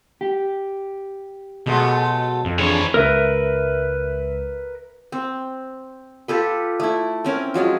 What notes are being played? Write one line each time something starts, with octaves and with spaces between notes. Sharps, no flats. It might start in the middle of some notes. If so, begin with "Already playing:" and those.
G4
B2 F#3 G#3 A3
F2
E3 D4 G#4 C#5
C#2 A#4 B4 E5
C4
F4 G4 A4 B4
A3 E4
C4 C#4 A#4
F3 F#3 G#3 F4